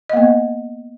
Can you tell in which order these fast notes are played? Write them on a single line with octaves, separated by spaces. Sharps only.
D#5 A#3 B3